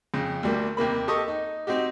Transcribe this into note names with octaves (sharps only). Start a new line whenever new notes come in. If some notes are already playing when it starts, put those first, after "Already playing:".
F2 C#3
D2 G3 A#3
D#2 C3 A#3 B5
G4 A4 D#5 C#6 D#6
D#4
C4 D#4 F#4 G4